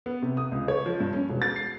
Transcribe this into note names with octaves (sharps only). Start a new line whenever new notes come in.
B3
C3
D#6
C#2
C#5
F3
G2
C#4
E1
A6
C7